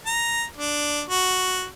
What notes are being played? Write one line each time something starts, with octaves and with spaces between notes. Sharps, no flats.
A#5
D4
F#4